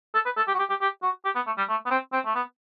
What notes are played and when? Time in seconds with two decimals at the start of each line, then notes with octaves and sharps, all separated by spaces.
0.14 A4
0.26 B4
0.37 A4
0.48 G4
0.54 F#4
0.59 G4
0.69 G4
0.81 G4
1.03 F#4
1.25 G4
1.35 B3
1.47 A3
1.58 G3
1.69 A3
1.86 B3
1.91 C4
2.13 C4
2.25 A3
2.35 B3